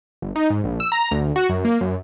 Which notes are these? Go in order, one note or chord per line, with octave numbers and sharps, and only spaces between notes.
G1
D#4
G#2
A#1
E6
A#5
D2
F#4
F#2
A#3
F#2